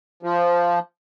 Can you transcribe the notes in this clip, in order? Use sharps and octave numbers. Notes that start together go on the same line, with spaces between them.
F3